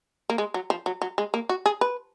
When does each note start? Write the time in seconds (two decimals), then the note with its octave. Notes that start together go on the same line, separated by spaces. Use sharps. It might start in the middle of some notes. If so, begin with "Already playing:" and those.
0.30 A#3
0.38 G#3
0.54 F#3
0.70 F3
0.86 F#3
1.02 F#3
1.18 G#3
1.34 A#3
1.49 F#4
1.66 G#4
1.81 B4